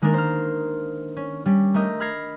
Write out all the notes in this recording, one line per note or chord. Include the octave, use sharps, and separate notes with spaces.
D#3 G#3 A#3 D4 A#4
C5 F6
C#4
G3 C#4
A3 D4 A#4 D#5 G6
B5 F6 G#6 A#6 C7